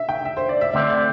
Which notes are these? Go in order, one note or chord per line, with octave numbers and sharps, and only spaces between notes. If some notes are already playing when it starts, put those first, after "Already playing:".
Already playing: E5
G5
E5
C5
D5
E5
D2 D3 C4 E5
D5